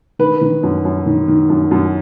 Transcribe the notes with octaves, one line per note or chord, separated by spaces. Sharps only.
D#3 B4
D#3
F#2
F#2
D#3
D#3
F#2
F#2